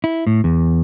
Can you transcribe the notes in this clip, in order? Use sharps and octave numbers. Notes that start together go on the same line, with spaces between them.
E4
A2
E2